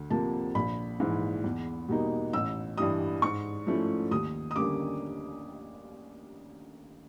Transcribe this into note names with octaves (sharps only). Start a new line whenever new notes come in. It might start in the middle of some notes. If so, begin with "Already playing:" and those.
Already playing: D2
C3 F3 A#3 A5
A#1 B5
G#2 E3
E2
B2 G3 A#3 D#4
A1 E6
G2 E3 G3 D#6
G#2 C#6
F3 A3 C#4 E4
D#2 D#6
D#6
D3 G3 A#3 C#4 D6